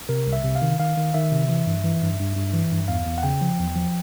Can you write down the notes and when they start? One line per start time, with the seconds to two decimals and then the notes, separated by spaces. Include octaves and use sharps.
0.09 C3 A#4
0.27 C2
0.33 E5
0.44 C3
0.55 F5
0.62 D#3
0.79 D#3 F5
0.97 D#3
1.14 D#3 E5
1.32 C3
1.49 E3
1.66 G2
1.84 E3
2.02 G2
2.19 G2
2.36 G2
2.54 E3
2.71 G2
2.88 E2 F5
3.06 E2
3.18 F#5
3.23 C#3 G5
3.41 F3
3.59 E2
3.76 F3